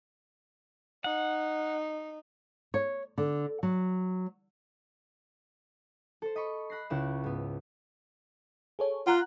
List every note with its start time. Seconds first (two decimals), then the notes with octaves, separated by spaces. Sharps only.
1.04 D#4 F#5
2.74 C#5
3.18 D3
3.63 F#3
6.22 A4 C5
6.36 D#5 B5 C#6
6.70 B5 F#6 A#6 C7
6.90 C#2 C#3 E4 C#6 F#6 E7
7.24 G#2 B3
8.79 G#4 A4 C#5
9.07 F4 F#5 A#5 F#6